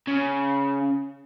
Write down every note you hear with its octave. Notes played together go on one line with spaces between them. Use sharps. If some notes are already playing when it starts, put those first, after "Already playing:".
C#3